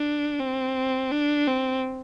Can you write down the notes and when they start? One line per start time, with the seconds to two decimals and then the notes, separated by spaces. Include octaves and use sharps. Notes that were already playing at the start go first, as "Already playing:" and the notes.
Already playing: D4
0.40 C4
1.11 D4
1.47 C4